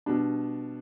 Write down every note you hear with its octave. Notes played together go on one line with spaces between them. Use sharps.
B2 G3 D4